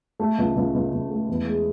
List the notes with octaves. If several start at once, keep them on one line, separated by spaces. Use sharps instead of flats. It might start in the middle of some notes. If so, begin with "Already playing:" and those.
A3
C#2
C#2
C#2
C#2
A3
E2
G#3